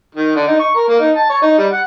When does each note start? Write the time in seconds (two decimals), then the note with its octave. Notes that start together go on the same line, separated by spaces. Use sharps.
0.15 D#3
0.35 D3
0.47 D#4
0.59 C#6
0.75 A#4
0.88 A#3
1.00 D#4
1.16 A5
1.30 C#5
1.42 D#4
1.58 G3
1.72 F#5